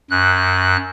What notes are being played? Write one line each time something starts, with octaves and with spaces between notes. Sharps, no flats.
F#2 F#6